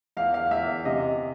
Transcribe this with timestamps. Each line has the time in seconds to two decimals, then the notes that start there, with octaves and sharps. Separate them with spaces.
0.17 E2 F5
0.34 F5
0.51 E2 E5
0.85 C3 D#5